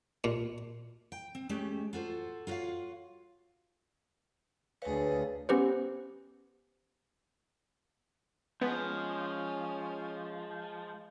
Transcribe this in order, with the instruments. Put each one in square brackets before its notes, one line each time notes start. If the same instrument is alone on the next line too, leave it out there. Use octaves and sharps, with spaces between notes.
[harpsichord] A#2
[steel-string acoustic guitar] G5
C4
G#3 A3 C#4 G4
F4 F#4 A4 C5
F4 F#4 A#4 C#5 F5
[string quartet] D2 G#4 [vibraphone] B4 C#5 F5
[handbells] B3 C#4 G4 B4 C5
[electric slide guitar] F3 [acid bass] G#3 [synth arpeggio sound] B3 [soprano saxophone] C#4